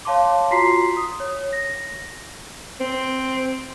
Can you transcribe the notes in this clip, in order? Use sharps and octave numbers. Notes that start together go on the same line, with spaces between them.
C#5 F5 A5 C6 D6
F4 F#4 A#5 C6 B6 C7
D#6
C#5
A#6
C4